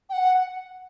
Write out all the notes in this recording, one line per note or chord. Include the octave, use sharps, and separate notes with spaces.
G5
F#5